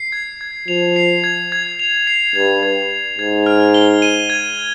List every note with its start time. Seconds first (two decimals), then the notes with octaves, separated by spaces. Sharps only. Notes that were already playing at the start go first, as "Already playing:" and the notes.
Already playing: C7
0.12 G#6
0.41 G#6
0.68 F3 F7
0.96 C7
1.24 G#6
1.52 G#6
1.79 F7
2.07 C7
2.36 G2 G#6
2.63 G#6
2.91 F7
3.18 G#2 G#6
3.46 F6
3.74 G7
4.02 D#7
4.30 G#6
4.57 F6